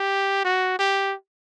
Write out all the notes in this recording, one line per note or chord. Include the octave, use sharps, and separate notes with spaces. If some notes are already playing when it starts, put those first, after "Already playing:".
Already playing: G4
F#4
G4